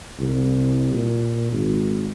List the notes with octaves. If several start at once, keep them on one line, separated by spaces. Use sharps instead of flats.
C2
A#2
G#1